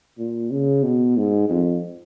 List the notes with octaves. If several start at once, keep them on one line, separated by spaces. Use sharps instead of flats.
A#2
C#3
B2
G#2
F2